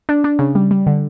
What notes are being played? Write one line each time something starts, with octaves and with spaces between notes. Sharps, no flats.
D4
D4
C#3
G3
G3
D3